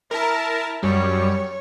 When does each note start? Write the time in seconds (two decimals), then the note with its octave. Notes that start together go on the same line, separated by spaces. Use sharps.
0.11 E4 A#4 A5
0.83 F#2 G3 C#5